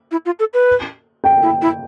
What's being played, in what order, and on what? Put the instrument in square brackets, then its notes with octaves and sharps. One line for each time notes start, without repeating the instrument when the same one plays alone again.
[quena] E4
F4
A4
B4
[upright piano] G5
[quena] E4
E4